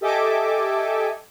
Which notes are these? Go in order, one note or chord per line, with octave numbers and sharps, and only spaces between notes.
G4 A4 D#5 E5 G#5 D6